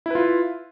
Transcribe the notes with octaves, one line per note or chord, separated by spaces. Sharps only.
E4 F4 B4